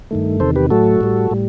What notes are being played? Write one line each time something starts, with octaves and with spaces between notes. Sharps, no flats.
G2 D#3 A3
E2 C3 D#3 A4 C5
G4 B4
A2 F#3 A3 F#4 A4
A2 G3
A2 G3